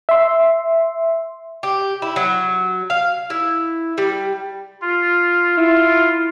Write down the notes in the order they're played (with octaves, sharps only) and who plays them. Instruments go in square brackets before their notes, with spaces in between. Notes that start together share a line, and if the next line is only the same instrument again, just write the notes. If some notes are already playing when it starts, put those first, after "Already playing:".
[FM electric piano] E5 C6
[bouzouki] G4
E4
F#3
F5
E4
G3
[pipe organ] F4
[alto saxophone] E4 [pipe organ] F4